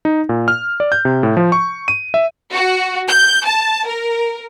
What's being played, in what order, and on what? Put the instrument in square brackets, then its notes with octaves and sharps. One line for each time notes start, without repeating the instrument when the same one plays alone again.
[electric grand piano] D#4
A#2
F6
D5
G6
C3
A2
F3
C#6
D#7
E5
[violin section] F#4
G6
A5
A#4